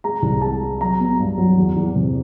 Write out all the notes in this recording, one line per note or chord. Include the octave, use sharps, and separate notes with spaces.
G#3 A#5
C2
G#3 A5
G#3
F#3 A#5
B3
G2
F#3
E2
E2
C3